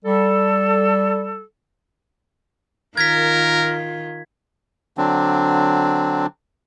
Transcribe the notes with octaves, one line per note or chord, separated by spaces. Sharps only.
G3 A4
D#3 F4 A#4 G#6 B6
D3 F#3 C4 D4